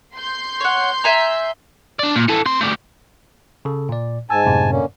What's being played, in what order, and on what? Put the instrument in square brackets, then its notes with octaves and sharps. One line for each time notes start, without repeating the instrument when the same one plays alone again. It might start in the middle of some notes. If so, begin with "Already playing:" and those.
[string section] C6 G6
[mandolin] C#5 F#5
E5 G#5 A#5
[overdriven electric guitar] D4 D5
A#2
E3 A4
C4 C6
A3 D5
[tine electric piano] C#3 A4
A#2 D5
[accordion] G#2 G#5 A5 [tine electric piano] E6
[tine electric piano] F#2 A2 C3
[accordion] D3 A#3 C#4